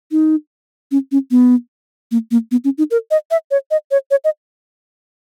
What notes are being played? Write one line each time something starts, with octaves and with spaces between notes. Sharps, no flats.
D#4
C#4
C#4
B3
A#3
A#3
B3
C#4
D#4
A#4
D#5
E5
C#5
D#5
C#5
C#5
D#5